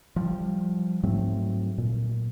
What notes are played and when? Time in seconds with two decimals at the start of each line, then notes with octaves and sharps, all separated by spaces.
0.16 F3 G3
1.03 G#2 F#3 A3 C4
1.78 A#2